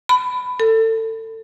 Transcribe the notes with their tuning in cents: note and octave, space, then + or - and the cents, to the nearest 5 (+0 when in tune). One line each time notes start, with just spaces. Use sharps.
B5 +15
A4 +25